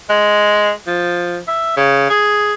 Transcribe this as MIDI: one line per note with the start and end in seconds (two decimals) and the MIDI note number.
0.10 0.72 56
0.87 1.38 53
1.47 1.75 76
1.77 2.10 49
2.10 2.53 68